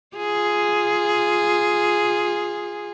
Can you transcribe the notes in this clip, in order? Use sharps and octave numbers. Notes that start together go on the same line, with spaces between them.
F4 G#4